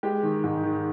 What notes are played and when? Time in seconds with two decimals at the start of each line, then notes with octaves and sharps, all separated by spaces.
0.03 G#3 G4
0.23 D#3
0.44 G#2
0.63 D#3